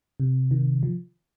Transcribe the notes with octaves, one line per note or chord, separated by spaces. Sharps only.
C3
D#3
F3